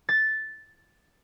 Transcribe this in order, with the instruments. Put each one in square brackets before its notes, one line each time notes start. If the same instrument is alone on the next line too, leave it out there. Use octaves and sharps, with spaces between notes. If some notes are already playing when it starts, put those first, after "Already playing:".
[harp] A6